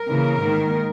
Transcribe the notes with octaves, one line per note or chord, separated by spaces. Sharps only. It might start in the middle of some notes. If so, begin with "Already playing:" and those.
Already playing: A#4
C#3 E3 A#3
G#2 D#3 A#3